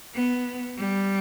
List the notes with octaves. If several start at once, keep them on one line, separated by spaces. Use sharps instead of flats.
B3
G3